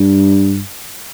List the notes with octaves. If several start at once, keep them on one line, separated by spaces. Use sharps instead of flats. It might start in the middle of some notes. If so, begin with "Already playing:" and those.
Already playing: G2